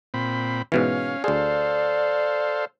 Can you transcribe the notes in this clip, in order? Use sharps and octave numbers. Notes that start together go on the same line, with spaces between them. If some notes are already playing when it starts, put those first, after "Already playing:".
A#2 C4 B5
G#2 B2 E3 C#4 F5
D2 G#4 A4 C5 D5 F5